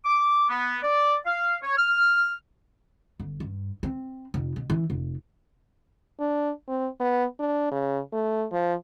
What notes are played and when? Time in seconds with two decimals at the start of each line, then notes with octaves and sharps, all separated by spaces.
0.05 D6
0.49 B3
0.83 D5
1.25 F5
1.63 C#5
1.77 F6
3.20 G1
3.40 G2
3.83 C4
4.34 F1
4.56 B2
4.70 E3
4.90 F1
6.20 D4
6.68 C4
7.00 B3
7.39 D4
7.71 C#3
8.12 A3
8.52 F3